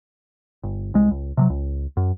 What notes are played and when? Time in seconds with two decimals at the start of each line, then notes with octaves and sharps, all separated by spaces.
0.63 G1
0.94 C2 G#3
1.11 C#2
1.37 C3 F3 F#3
1.50 C#2
1.97 F#2